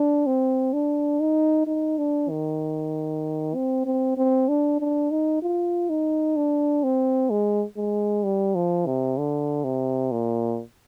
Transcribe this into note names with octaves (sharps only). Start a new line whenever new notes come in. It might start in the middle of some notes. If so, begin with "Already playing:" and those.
Already playing: D4
C4
D4
D#4
D#4
D4
D#3
C4
C4
C4
D4
D4
D#4
F4
D#4
D4
C4
G#3
G#3
G3
F3
C3
D3
C3
A#2